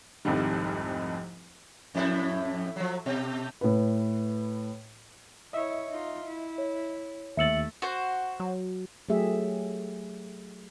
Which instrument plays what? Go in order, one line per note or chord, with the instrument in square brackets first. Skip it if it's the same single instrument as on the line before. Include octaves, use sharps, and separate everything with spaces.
[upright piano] F1 C2 F2 G#2 D#3 G3
[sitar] F2 A2 E4
F3 F#3
B2
[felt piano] A2 B4
[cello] E4 C#5 [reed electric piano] D#5 E5
[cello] D#4 F4
E4
[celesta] C#5
[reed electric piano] D#2 E6 A6 [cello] A3 [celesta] E5 C#7 F#7
[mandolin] F#4 C5
[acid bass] F#3
[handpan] F#3 A3 G4 G#4 E5